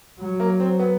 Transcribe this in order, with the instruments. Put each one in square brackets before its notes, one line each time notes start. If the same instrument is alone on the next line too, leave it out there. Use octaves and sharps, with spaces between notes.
[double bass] F#3
[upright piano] A#3
C4
B3